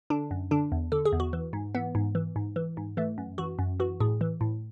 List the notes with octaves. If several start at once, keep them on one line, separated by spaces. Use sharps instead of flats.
D3 D4
F#2
D3 D4
E2
D3 A4
G#4
E2
F#4
E3
G#2
E3 B3
G#2
E3
G#2
E3
G#2
E3 A3
F#2
E3 F#4
F#2
E3 F#4
A2 G#4
E3
A2